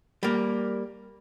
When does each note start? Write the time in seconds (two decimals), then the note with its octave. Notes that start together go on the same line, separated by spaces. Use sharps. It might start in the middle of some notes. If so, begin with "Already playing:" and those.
0.23 G3 A#3